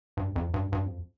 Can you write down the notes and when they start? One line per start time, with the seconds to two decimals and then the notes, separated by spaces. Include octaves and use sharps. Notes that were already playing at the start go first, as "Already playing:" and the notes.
0.17 G2
0.36 F2
0.54 G2
0.72 G2
0.85 F2